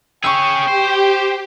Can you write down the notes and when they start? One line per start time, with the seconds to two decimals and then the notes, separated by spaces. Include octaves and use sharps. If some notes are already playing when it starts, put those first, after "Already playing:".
0.24 C#4 G#4 G5 C#6 E6
0.68 G4 C5